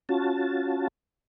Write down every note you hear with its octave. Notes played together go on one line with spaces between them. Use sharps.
C#4 F4 F#4 A5